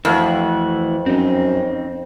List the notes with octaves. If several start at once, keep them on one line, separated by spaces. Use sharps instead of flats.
F2 E3 A3 F#4
F#2 C4 D#4